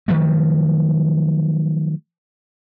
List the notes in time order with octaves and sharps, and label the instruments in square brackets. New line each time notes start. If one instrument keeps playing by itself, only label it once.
[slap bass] D#3 F3 F#3 A3